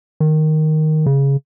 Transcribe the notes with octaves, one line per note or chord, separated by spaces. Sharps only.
D#3
C#3